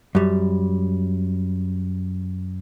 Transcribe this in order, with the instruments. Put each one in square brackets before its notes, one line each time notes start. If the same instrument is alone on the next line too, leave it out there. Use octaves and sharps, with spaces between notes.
[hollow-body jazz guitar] F#2 G3